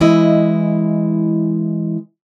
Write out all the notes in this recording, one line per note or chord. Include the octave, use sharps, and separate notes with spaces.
E3 G#3 E4 D#5